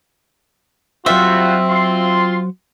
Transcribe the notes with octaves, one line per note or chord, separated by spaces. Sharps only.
F#3 G3 C4 F4 F#4 C5 E5
F4 C6